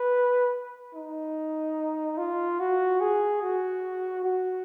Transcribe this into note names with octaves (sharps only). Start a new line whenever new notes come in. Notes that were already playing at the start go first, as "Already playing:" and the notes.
Already playing: B4
D#4
F4
F#4
G#4
F#4
F#4